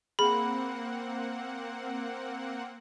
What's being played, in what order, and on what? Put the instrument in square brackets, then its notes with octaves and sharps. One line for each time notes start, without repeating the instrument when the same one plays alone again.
[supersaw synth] A#3 C4 F#5 [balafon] G#4 [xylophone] B5